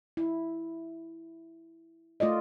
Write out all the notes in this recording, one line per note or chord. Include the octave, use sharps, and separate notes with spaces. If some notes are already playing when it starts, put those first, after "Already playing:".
E4
A3 F4 D5 D#5